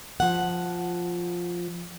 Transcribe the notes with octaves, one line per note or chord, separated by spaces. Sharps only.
F3 F#5